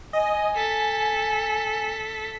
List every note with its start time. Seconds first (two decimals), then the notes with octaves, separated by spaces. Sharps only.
0.13 D#5 G#5
0.56 A4 B6